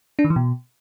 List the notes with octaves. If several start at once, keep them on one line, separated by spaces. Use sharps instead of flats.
D4
D#3
E3
B2